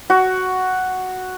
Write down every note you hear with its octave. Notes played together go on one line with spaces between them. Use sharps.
F#4